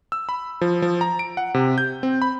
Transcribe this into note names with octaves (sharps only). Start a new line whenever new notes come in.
E6
B5
F3
F3
A#5
D7
F#5
C3
G6
C4
B5